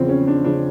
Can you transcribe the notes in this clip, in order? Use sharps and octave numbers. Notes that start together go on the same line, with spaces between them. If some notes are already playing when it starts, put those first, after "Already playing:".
Already playing: E2 C#3 F3 C4
C#4
D4
C#3 F3 D4